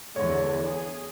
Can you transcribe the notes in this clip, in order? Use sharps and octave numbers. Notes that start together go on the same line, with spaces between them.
E2 D3 C#5
G#4